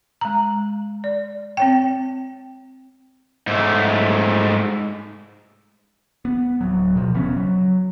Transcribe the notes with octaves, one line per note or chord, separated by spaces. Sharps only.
G#3 A#5
D5
C4 C#5 G5
G#2 A3
B3
D1 F#3
B2 F3
E1 C#3 B3 C#4
F#3